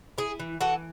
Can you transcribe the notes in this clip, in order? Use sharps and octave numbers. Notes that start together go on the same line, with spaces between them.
E4 G#4
E3
E3 F#4 A4